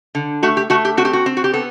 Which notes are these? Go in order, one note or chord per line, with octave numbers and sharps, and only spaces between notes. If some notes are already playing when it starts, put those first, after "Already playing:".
D3
A3 F#4
G4
A3 F#4
G4
C4 F#4
G4
F#4
C4
F#4
G4
B3 A4